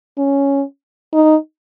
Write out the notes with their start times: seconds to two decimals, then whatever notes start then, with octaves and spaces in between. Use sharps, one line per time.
0.18 C#4
1.14 D#4